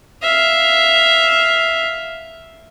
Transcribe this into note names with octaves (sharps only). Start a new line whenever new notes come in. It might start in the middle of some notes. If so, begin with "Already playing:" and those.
E5 F5